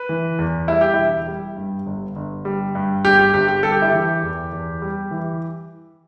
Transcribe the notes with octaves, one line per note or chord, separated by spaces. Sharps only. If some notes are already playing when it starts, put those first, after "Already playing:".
Already playing: B4
E3
E2
G3 E4
G4
E1 E4
G3
G2
G1
G1
G3
G2
G1 G4
G4
G1 G4
G4
G3 A4
G4
E4
E3 G4
E2
E2
G3
E3